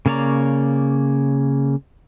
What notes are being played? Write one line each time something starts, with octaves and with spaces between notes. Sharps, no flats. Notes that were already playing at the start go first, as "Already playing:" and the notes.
C#3 A#3 C#5 D5 A#5